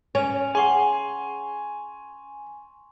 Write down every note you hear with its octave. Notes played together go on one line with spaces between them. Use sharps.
C#4 G#5 F7
G#4 F#5 G#5 C6 C#6